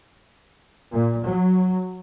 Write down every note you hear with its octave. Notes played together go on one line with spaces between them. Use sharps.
A#2
F#3